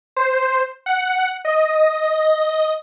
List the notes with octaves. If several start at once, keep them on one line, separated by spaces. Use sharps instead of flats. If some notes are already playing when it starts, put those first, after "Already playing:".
C5
F#5
D#5